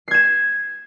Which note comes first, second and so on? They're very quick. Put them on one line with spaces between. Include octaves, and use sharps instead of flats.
C7 G#6 E7